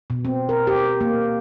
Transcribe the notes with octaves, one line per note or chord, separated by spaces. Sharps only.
B2
C4
A#4
G4
A#3